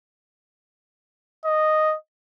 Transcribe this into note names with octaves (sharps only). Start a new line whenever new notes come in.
D#5